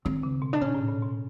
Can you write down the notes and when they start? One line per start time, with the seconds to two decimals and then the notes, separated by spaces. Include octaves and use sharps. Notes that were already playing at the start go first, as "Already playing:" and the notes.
0.05 D#3 C4
0.23 C#3
0.42 B2
0.53 D4
0.61 A#2 C#4
0.74 A2
0.88 A#2
1.02 B2